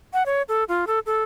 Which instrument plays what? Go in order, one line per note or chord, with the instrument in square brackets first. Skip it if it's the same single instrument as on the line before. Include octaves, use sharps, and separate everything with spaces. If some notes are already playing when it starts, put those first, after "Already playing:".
[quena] F#5
C#5
A4
F4
A4
A4